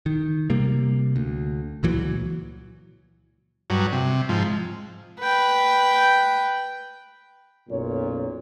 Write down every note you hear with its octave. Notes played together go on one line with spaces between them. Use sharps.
D#3
C3 G3 A#3
D2
C#2 A#2 E3 F#3
G2 F#3
C3
G#2 F3
B4 G5
B1 F#2 A#2 C#5